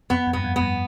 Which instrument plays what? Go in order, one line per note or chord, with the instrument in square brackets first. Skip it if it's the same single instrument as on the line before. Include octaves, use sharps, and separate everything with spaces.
[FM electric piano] F2 [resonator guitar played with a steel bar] B3
[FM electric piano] F2
[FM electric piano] G2 [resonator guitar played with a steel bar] B3
[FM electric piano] F2
[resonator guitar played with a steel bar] B3
[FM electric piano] G2